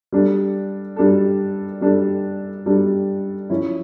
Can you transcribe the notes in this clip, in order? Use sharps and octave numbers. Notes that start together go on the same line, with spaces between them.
G3 D4 A4
G3 D4 A4
G3 D4 A4
G3 D4 A4
F3 C#4 E4